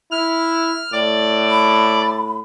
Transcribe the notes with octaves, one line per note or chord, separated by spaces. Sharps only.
E4 F6
A2 D5
B5